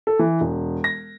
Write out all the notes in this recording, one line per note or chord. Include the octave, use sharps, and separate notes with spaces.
A4
E3
E1
A#6